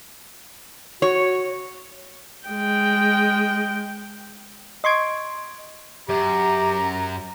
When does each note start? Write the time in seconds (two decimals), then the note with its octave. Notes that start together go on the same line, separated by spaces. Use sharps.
1.02 F#4 C#5
2.47 G#3 G5
4.84 D#5 C6 C#6 G#6 D7
6.09 F#2 G4 A#5